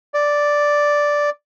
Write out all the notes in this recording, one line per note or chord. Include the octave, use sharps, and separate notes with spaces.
D5